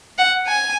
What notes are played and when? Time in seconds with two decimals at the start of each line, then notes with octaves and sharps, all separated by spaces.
0.18 F#5
0.47 G#5